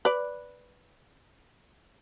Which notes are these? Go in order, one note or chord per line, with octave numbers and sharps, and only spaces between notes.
B4 D5